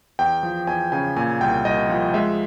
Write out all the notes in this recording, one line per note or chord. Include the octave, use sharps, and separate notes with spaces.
E2 G5
F3
E2 G#5
C#3 G#5
A#2 G#5
C2 G5
C2 D#5
F3
G#3 E5